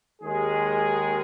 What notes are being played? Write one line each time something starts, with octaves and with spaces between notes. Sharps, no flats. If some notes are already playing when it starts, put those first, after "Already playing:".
D#2 D#3 G#3 G#4